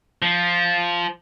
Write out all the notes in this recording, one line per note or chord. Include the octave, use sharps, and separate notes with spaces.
F3